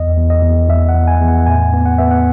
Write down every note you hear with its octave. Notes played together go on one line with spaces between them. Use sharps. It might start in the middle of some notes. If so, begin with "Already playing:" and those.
Already playing: E2 D#5
E2
D#5
E2
E2 E5
F#5
E2
G#5
E2
F#5
A2 G#5
B3
F#5
B3 E5
F#5